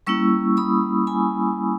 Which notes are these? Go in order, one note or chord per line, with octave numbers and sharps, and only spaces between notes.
G3 A#3 C#4 E4 C#6 E6
B5 D#6
G#5 B5